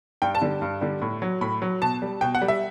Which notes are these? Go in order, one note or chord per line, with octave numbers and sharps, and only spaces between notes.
G2 G5
A5
D3 G3
G2
D3 G3
A2
F#3
A2 B5
F#3
B2 A5
G3
B2 G5
F#5
G3
E5